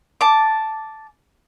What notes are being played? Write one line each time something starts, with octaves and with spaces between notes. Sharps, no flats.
A5 D6